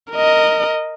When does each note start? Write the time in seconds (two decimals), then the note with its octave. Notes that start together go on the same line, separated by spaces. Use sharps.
0.12 A#4 D#5